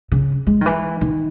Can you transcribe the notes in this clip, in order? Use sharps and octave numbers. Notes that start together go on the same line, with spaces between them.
C#3
G#3
D#3
E3
D#3